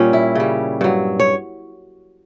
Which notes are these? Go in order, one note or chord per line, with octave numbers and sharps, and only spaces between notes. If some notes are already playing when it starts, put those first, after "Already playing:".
Already playing: A#2 G3 C#4
E4
C#3 G3
G2 F#3
C#5